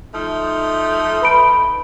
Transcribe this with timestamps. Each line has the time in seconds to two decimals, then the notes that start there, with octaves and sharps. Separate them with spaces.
0.13 F3 A3 D#4
1.22 B4 B5 D7